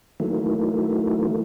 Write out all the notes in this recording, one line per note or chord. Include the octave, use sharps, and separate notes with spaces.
D#3 E3 F#3 A3 A#3